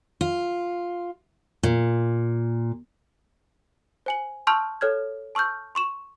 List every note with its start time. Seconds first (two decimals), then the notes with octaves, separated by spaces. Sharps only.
0.21 F4
1.63 A#2
4.06 C5 G#5 F#7
4.47 A5 C6 C#6 E6 F6 G6
4.81 A4 C#5 F6 G#6
5.35 A5 C#6 E6 F6 G6
5.75 C6 C#6 E7